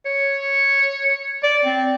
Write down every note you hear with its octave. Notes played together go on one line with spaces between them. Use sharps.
C#5
D5
C4